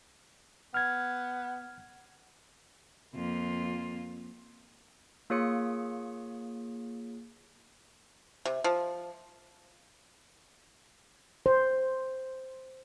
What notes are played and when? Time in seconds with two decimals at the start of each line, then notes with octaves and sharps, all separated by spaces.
0.74 B3 F6 G#6
3.14 F2 A#3 F4
5.30 A#3 F4 G#4 C#5 D#6 C#7
8.45 C3
8.64 F3
11.46 C5